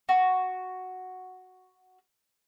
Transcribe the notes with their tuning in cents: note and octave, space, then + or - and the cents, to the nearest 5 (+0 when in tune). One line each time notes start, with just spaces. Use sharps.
F#4 +0